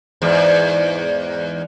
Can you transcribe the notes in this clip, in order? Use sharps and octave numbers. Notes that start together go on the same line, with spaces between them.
E2 G#2